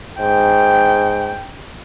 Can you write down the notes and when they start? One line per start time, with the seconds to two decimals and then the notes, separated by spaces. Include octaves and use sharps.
0.20 G#2 G5